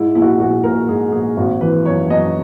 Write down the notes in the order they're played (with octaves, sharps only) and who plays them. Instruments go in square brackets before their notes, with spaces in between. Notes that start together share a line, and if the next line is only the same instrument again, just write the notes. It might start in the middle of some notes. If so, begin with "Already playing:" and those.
Already playing: [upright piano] G#2 E4
A#1 E4
F#4
E4
A#1 F#4
A#1 A#4
G#2 G#4
A#1 G#4
G#1 F#4
E3 B4
F#2 C#5
F#2 D#5